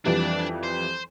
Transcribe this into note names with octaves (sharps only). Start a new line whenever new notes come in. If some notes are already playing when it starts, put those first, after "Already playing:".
F2 E3 G3 D4 D5
C5